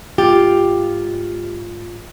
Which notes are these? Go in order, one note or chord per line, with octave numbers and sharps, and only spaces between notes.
G#2 F4 G4